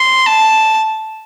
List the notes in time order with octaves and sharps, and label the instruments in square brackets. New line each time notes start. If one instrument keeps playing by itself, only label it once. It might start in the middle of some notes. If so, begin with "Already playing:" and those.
Already playing: [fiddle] C6
A5